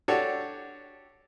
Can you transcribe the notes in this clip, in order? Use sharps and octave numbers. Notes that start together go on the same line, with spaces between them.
D4 F#4 G4 A4 C#5 D5